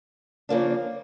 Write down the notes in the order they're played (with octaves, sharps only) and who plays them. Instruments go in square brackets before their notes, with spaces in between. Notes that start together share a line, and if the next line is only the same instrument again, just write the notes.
[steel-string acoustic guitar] C#3 F3 A#3 D4